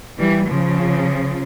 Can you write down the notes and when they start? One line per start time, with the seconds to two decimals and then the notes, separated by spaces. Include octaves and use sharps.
0.18 E3 G3
0.47 C#3 F3